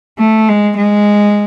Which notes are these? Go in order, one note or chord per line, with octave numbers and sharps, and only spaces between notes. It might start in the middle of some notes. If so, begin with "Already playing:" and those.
A3
G#3
G#3